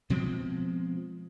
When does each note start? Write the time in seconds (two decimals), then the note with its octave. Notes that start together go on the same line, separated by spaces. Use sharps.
0.10 B2 F3 G#3 C4